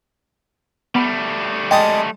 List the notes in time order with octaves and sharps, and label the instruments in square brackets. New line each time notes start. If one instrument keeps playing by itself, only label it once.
[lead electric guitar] G3 A3 [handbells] B3 B5 D7
[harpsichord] G#3 A5 D#6 [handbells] G5